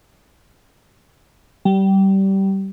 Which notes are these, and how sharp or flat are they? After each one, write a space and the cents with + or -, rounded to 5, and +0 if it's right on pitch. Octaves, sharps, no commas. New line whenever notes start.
G3 -20